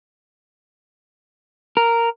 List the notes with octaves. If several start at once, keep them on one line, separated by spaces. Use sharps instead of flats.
A#4